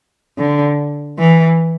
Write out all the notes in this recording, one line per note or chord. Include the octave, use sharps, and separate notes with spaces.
D3
E3